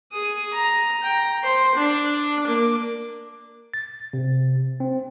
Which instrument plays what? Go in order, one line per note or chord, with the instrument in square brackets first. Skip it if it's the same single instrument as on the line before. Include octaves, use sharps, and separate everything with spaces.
[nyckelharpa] G#4 D#6
A#5
G5 A#5
C5 C6
D4
A#3 D6
[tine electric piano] A6
C3
C4